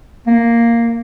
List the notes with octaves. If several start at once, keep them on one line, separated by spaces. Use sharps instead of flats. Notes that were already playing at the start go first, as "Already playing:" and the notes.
A#3